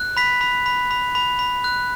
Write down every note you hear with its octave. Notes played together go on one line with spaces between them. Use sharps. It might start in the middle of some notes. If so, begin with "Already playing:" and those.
Already playing: F#6
B5 B6
B5
B5
B5
B5
B5
F#6